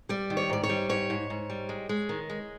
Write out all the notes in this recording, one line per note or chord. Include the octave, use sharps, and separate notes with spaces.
G3 D5
D#3
C#5
G#2 D5
C#5
G3
G#2 C#5
G#2
G#2
G3
G#3
G#3
D#3
G#3